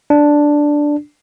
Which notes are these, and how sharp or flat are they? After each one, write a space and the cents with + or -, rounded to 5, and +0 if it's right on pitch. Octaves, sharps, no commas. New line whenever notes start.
D4 +0